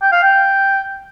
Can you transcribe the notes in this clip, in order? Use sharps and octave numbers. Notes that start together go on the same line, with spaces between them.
G5
F5
G5